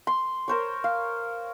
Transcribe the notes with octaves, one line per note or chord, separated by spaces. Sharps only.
C6
A#4 C5 C#5
F5